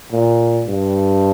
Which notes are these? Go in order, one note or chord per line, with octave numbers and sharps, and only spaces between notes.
A#2
G2